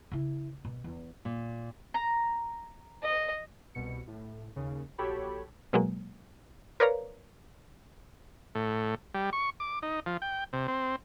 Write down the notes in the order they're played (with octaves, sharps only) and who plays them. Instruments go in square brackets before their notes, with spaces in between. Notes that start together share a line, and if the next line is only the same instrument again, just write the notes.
[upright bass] C#3 E4
B2
E2
[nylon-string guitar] A#2
[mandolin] A#5
[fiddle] D#5
[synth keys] C2 B2 C#7
A2
D#2 C#3
A#1 F#4 G4 A4 C#5 B5
[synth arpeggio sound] B2 F#3 G#3 A#3
A#4 B4 C#5 D5 F5 A#5
[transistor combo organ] A2
G3
C#6
D6
D#4
F3
G5
C3
C4